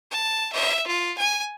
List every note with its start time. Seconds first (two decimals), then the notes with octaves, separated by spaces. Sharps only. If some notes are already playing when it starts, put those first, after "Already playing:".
0.11 A5
0.53 E5
0.87 F4
1.18 G#5